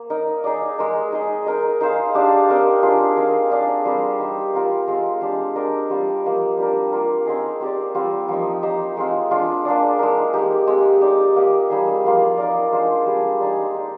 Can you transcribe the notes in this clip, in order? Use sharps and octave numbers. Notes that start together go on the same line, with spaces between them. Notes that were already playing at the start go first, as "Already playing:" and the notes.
Already playing: A#3
D#4 A#4 D#5
D#4 G#4 D5
G#3 D#4 A#4
D#4 G#4 D#5
D#4 A#4 D#5
D#4 G#4 C5 F5
D4 G4 D5 F5
C4 D#4 A#4 D#5
D4 F4 G#4
C4 D#4 A#4 F5
D4 G#4 D5 F5
G3 C4 G4 A#4
D#4 G4 C5
C4 F4 A#4
G#3 C4 F4
G#3 D4 G4
D4 G4 A#4 D#5
G3 C4 F4
F3 A#3 D#4 G4
G3 D4 G4 A#4
A#3 F4 A#4
C4 D#4 G#4
C4 G4 A#4 D5
G3 C4 F4 A#4
F3 A#3 D#4
D#4 G4 C5 D#5
G#3 C4 F4
G#3 D4 F4
A#3 D4 G#4 D5
G#3 D#4 A#4
A#3 D#4 G4
G#3 C4 G4
D#4 G4 D5
A#3 D#4 G4
G3 A#3 D#4 G#4
F3 A#3 F4
D#4 A#4 D5
G#3 D4 F4 C5
G3 D4 G#4
G#3 D#4 G#4 D5
D#4 G4 D5